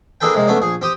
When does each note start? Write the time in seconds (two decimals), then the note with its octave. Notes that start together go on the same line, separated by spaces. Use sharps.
0.21 A#3 D4 G#4 A4 B4 G5
0.35 C3 G#3 A#3
0.48 A3 B3 C#4 D4
0.60 A#1 G#4
0.82 C4 G4 D#6